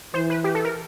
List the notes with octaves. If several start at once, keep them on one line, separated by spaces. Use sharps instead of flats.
E3 C5
B4
G4
A4
A#4